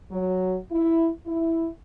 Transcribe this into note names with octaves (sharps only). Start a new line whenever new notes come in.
F#3
E4
E4